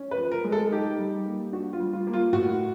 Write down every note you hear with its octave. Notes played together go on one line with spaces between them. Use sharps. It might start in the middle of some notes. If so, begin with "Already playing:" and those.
Already playing: C#4
B4
F3
A#4
G#3
A4
D#4 G4
G3
A#3
D4 F#4
F4
G3
F4
A#3
F4
A2 F#4